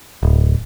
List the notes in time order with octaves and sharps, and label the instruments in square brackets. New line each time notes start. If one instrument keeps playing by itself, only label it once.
[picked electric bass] D1